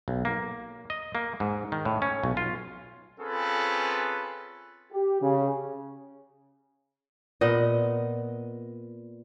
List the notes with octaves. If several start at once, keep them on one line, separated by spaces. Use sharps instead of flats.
B1
A#3
D#5
A#3
G#2
D#3
A2
C#4
B1
F4
C4 C#4 F4 G#4 A4 B4
G4
C#3
A#2 B3 D#5